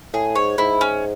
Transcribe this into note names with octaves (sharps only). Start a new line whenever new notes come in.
A2 G#4
G#2 C#5
G#2 E4
C#4